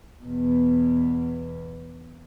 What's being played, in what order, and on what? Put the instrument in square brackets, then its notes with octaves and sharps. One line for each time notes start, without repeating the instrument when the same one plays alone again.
[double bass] E2 B2